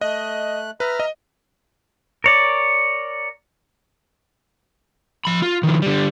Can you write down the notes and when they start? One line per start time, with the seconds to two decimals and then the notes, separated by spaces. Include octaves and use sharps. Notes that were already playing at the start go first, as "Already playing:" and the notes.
0.01 A3 D#5 F#6
0.80 B4 E5 A#5 F6
1.00 D#5
2.24 A#4 C#5 D5
5.25 F3 B5
5.42 F4
5.63 D#3 F3
5.82 D3 G3